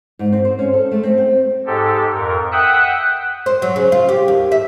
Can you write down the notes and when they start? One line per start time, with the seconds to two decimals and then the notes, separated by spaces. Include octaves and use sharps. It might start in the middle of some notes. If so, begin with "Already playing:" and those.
0.19 G#2
0.32 C4
0.45 C5
0.59 C#4
0.73 A4
0.92 A3
1.03 C4
1.18 G5
1.66 G#2 G4 A4
2.15 F2 A#4
2.52 E5 F#5 G5 D#6 E6 F#6
3.46 C5
3.62 F#3
3.76 C#3
3.92 F4
4.09 G4
4.28 D#2
4.52 E5